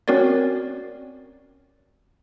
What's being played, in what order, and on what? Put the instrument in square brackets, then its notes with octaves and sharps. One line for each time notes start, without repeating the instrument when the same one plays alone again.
[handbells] C4 C#4 F#4 A#4 C#5 D5